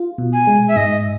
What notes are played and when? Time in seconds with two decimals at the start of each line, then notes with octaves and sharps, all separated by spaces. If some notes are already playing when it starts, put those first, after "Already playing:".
Already playing: F4
0.18 B2
0.33 G#5
0.47 G#3
0.68 E5
0.76 G#2 D#5